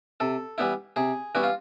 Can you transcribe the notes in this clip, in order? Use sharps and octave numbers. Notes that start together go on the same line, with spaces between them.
C3 A4
E3 G3 B3 E4
C3 G#4
E3 G3 B3 E4 F#4
F4